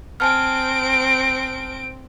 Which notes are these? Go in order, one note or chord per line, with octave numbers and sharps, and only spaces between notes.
C4 G#5 A5 F6 D7